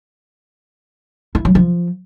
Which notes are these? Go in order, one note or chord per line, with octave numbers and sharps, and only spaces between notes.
E4
F#3
F3